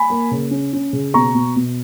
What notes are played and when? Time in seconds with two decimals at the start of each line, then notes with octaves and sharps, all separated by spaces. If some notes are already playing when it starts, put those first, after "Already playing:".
Already playing: G#5 B5
0.10 A#3
0.31 C#3
0.51 C#4
0.73 C#4
0.93 C#3
1.14 B2 A#5 C#6
1.35 B2
1.56 B2